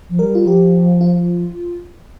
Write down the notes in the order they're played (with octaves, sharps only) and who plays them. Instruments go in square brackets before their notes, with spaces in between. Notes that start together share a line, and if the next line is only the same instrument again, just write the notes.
[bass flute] F3
[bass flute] G3 [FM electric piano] A#4
[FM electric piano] F4
[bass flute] F3 [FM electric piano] G4
[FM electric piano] F4